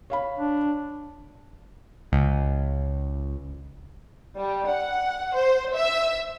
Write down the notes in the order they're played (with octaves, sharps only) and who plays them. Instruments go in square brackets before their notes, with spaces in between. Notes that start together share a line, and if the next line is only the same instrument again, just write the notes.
[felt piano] C#5 F5 B5
[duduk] D4
[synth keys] C#2
[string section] G3
F#5
C5
E5